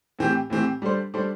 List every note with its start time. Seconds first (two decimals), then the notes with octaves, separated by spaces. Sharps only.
0.19 A2 E3 C4 G4
0.50 A2 E3 C4 G4
0.82 G3 D4 A4 C5
1.14 G3 D4 A4 C5